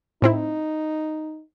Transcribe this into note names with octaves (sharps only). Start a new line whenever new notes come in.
A2 C4 D#4 E4